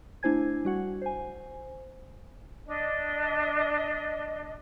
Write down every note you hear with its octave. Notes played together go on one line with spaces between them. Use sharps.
A3 D4 E4 C5 G#5 G#6
G3 F#4 F#5
C5 G#5
D4 D#5